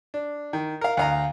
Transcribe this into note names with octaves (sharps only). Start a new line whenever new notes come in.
D4
D#3
A#4 F5
D2 F5 A#5